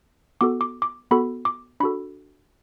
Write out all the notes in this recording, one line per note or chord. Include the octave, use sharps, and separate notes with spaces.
B3 F#4 A4 D6
D6
D6
B3 F#4 A4 B5
D6
D4 F#4 A4 B5